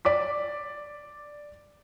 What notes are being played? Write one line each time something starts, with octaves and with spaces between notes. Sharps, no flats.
D5 D6 B6